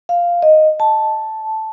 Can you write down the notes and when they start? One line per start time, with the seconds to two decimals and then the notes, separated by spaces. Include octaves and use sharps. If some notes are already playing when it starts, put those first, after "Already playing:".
0.09 F5
0.42 D#5
0.80 A5